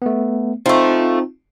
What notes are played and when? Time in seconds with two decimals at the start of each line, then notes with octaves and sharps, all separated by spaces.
0.02 A3 B3
0.66 F3 A3 C4 D#4 F4